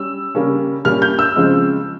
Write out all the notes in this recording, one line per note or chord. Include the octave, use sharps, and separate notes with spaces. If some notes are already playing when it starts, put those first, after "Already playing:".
Already playing: G3 C#4 E6
C#3 G3 A#3 C#4
A#2 G3 A#3 C#4 F6
G6
E6
C#3 F3 G#3 C4